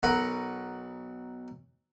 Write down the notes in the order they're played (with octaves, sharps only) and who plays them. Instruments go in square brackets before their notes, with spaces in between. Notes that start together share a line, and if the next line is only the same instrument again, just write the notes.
[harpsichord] B1 A#4 B4 F#5 B5 C#6